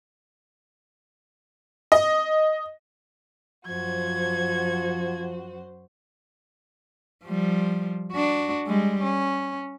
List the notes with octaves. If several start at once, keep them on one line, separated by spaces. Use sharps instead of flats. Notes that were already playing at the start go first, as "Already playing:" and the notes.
D#5
F#2 F3 F#4 C5 G#6
F3 G3
D4 F#4
G3 G#3
C#4